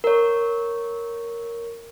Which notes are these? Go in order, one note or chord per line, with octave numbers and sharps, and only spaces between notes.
A#4 C#5